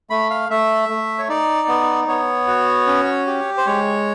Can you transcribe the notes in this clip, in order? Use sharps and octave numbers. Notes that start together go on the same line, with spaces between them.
A3 B5
F5
A3 E5
A3
C#5
D#4 D5
B3
B3 C#5
F#4
C#4
G4
C5
G#3 C#5